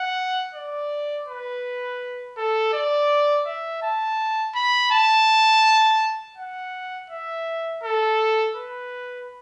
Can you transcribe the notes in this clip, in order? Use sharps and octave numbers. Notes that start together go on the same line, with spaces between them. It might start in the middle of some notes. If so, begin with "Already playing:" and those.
Already playing: F#5
D5
B4
A4
D5
E5
A5
B5
A5
F#5
E5
A4
B4